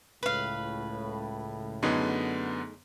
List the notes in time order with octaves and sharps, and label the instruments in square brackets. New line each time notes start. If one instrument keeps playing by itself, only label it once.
[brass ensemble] C#2 A2 [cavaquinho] B4 F5
[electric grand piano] F#2 D3 B3 [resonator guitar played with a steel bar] A3 D#4 G#4